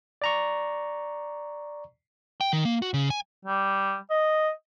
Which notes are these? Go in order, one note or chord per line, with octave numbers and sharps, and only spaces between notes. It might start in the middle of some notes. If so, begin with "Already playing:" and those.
D5 A#5 C#6
G5
D#3
A#3
F#4
C#3
G#5
G3
D#5